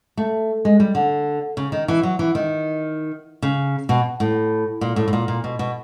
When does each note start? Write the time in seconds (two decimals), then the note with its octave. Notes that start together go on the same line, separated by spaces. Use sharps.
0.17 A3
0.65 G#3
0.80 G3
0.95 D3
1.57 C#3
1.72 D#3
1.88 E3
2.03 F#3
2.19 E3
2.35 D#3
3.42 C#3
3.89 B2
4.20 A2
4.81 A#2
4.96 A2
5.08 A2
5.13 A#2
5.28 A#2
5.44 B2
5.59 B2